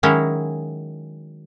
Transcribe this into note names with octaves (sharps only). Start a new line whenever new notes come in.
D#3 F#3 G#3 C#4 E4